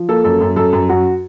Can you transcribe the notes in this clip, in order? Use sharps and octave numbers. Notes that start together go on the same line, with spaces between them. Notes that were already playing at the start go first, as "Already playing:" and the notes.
Already playing: F3
A#3 A4
F#2 A4
F#2
F#2 A4
F#2
F#2 F#4